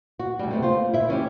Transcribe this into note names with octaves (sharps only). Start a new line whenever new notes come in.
F#4
D2 G3
C3 A3 B3
F4 C5
E4 E5
E3 C#4 E4 G4